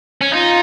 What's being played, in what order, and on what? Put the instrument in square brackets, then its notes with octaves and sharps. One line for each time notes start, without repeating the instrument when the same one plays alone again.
[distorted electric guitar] C#4
[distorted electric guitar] D#4 [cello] F4